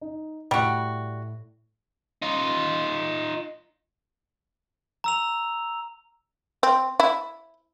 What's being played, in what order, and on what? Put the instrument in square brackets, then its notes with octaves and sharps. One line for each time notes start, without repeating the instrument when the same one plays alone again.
[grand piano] D#4
[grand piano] A2 [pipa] G3 F#4
[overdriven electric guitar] D#4 F4
[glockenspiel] A#5 E6 F7
[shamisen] C4
E4